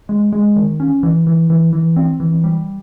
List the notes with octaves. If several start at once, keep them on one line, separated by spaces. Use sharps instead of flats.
G#3
G#3
D#3
C#4
E3
E3
E3
E3
C4
E3
G3